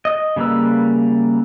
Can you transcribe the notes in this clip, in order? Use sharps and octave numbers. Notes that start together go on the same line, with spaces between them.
D#5
C#3 G3 A#3 B4 E6